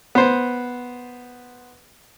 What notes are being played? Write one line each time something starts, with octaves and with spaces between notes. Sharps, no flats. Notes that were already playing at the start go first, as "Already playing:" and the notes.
B3 C5